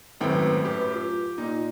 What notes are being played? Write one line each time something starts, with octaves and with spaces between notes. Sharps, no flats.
G#1 F#2 A2 C4 B4 G5
G4
F4
A#2 D#4